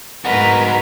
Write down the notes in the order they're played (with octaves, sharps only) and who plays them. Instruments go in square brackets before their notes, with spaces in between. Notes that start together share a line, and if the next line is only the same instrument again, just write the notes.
[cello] G#2 B4 [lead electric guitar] D#4 F#4 [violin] A#4